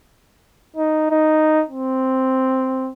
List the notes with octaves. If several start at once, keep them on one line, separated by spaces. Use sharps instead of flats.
D#4
D#4
C4